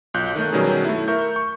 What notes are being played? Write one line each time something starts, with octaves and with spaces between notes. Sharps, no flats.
B1 F4 F#6 G6
D#3 A3
B2 D#3 F#3 G3 C#4 G#4
A3 E4
A#4 E5 C#6 G6
C#6